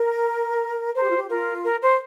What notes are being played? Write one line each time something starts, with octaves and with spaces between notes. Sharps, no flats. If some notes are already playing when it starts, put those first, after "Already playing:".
Already playing: A#4
A#4 C5
G4
F4
G4
F4 A#4
A#4
C5